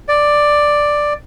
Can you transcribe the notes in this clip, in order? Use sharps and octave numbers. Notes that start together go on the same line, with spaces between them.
D5